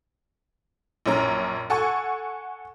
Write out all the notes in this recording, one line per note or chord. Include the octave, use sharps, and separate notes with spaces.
A#1 F#2 C#4 A#5
A4 F#5 G#5 C#6